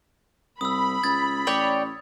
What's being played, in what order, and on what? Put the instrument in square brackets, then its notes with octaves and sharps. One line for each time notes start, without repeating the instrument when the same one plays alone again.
[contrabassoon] C2 [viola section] B5 [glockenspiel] D#6 E6
[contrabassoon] C#2 [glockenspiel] D#6 G#6 A6
[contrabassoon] A1 [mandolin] C#5 D5 G5